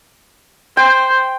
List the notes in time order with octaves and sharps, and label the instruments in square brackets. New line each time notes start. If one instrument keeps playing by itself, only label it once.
[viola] C5 [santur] G5